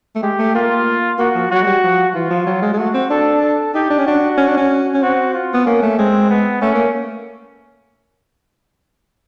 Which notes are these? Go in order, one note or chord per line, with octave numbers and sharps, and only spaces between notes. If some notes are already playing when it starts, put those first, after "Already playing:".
A3
G#3 G4
A3
A#3 F4
A#3 F#4
F3
F#3 F#4
G#3
G3
F3
E3 F4
F3
F#3
G#3
G#3
A3 F#4
C4
D4 A4
A4
D#4 G4
D4
C#4
D4 F#4
C#4
D4
C#4
C#4
C4 F#4
F4
B3
A#3 C#4
A3
G#3 C4
B3
A3 C#4
A#3